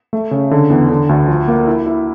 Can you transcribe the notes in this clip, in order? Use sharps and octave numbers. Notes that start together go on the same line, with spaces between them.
A3
C#3
D3
E2
D3
D2
F3
A#3
E4
E4